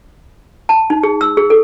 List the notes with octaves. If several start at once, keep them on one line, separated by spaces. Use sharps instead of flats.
A5
D#4
G#4
E6
G#4
A4